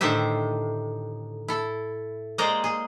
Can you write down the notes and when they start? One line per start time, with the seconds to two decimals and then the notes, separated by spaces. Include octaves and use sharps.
0.01 A2 D3 D#3 G4 C5 E5
1.48 E4 A4
2.38 G#3 A#3 C5 D5 A#5
2.64 G#4